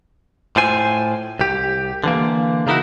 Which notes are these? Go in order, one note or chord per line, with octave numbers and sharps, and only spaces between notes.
A2 F4 C5 G#5
C2 G4
D3 E3 A#3
C#3 A#3 D#4 E4 F#4